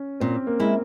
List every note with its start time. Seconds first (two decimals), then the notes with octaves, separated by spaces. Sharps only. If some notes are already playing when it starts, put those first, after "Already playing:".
Already playing: C#4
0.20 A#2 C4
0.47 A#3
0.60 G#3 E4